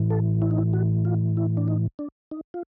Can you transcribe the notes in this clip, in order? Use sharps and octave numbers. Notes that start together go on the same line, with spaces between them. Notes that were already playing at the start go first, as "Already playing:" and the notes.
Already playing: A2 E3
A4
E4
D#4
E4
F#4
F4
E4
D4
D#4
D4
D#4
F4